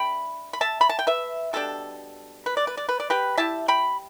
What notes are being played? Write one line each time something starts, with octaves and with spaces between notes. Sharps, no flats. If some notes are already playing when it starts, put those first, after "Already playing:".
Already playing: A3 D4 G5 B5
B5
E5 A5
B5
A5
G5
B4 E5
B2 G3 D4 A4
B4
D5
B4
D5
B4
D5
G4 B4
G3 E4 E5 A5
G5 B5